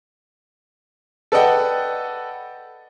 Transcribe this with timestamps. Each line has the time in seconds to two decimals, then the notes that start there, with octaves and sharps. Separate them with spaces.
1.32 A4 B4 D5 D#5 F#5 G5